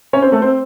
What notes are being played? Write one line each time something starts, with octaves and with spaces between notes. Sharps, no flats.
C#4 C#5
C4 C5
A3 A4
C4 C5